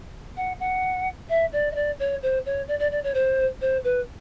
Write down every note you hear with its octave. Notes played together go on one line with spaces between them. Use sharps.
F#5
F#5
E5
D5
D#5
D5
C#5
C5
C#5
D5
D5
D5
C#5
C5
C5
B4